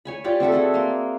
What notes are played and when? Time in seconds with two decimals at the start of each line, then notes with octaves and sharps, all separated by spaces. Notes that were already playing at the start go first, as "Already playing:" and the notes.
0.05 C#5 G#5 B5
0.24 F4 G4 D5 G5
0.40 C4 F#4 A4 E5
0.52 G#4 A4 F#5
0.74 A#3 C6